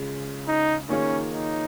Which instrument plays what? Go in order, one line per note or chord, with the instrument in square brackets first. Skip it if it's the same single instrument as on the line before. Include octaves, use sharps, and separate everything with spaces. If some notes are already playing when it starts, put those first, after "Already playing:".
Already playing: [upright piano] C#3 G#3 F4
[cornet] D#4
[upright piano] D#3 A#3 F4 G#4 C#5 [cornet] C#4
[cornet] D#4